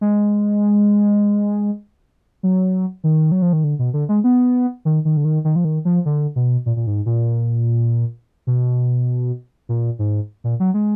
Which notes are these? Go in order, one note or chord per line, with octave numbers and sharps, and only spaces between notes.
G#3
F#3
D#3
F#3
F3
D#3
D3
B2
D3
G#3
B3
D#3
D#3
D3
D#3
D#3
F3
D#3
F3
D3
B2
A#2
A#2
G#2
A#2
B2
A#2
G#2
A#2
F#3
G#3